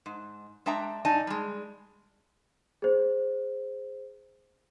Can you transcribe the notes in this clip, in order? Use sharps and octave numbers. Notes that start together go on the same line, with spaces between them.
G#2
G#3 D4 E5 G5 A#5
G2 D#4 D5 G#5 A5
G3 G#3
G#4 C5